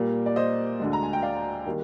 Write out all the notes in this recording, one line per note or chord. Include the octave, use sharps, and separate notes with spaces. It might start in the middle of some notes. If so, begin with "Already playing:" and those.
Already playing: A#2 G3 A#3
D5
C5 D#5
D2 D3 G#3
A#5
G#5
G5
D5 F5
D#3 G3 A#3